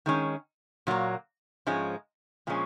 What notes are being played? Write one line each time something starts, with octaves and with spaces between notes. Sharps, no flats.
D#3 G#3 C#4
A#2 F#3 A#3
G#2 F3 G#3 C#4
A#2 F3 G#3 C#4